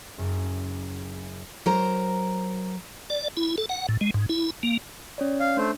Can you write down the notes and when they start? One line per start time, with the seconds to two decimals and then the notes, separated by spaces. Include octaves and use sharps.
0.18 F#1 F#2
1.66 F#3 A#4 C5 A#5
3.10 D5
3.37 E4
3.58 A4
3.69 F#5
3.89 A2
4.01 G#3
4.14 G#2
4.29 E4
4.63 A#3
5.18 C#4 C#5 D5
5.40 F5
5.57 A3 D4 C5